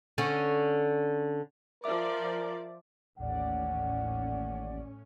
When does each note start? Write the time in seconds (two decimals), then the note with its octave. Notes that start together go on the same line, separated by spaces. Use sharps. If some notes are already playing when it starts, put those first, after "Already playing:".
0.18 D3 C#4
1.84 F3 A#4 D5 E5 D6
3.19 A1 D#2 A2 C#4 D5 F#5